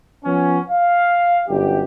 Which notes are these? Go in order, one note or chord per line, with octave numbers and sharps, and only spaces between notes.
F3 B3 C#4
F5
G1 F#2 G4